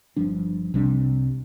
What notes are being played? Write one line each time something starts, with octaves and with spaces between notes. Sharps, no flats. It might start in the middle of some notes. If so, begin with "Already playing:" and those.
G1 G2 F3 D4
C2 C3 G3 D4